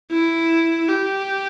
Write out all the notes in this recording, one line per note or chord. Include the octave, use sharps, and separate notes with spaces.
E4
G4